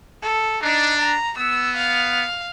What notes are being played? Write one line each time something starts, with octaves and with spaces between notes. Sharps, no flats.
A4
D4 D#4
A#5
B3 E6
F5